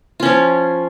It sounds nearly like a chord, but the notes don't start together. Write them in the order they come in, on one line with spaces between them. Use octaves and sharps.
F4 C#4 F3